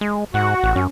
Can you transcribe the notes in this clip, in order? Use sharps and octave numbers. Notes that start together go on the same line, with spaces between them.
G#3
G#2 F#4 F#5
A1
F#2 C#4